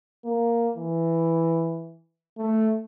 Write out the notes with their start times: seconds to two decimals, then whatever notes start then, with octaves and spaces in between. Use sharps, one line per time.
0.25 A#3
0.76 E3
2.37 A3